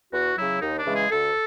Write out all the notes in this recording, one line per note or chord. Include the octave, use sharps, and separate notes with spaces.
E2 F#4
C#3 F#3 E4
D#2 D#4
D4
C#3 E3 G#3
G#4
D2 A4